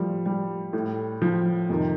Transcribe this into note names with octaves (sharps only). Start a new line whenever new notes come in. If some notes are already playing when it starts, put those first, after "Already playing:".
Already playing: A2 F3 G3
G3
A2
F3
F2 C3 D#3